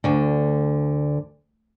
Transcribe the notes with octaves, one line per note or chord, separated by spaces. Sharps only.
D2 D3